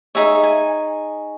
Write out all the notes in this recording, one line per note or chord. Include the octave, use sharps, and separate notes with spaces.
D#4 G#4 C#5 E5
G#5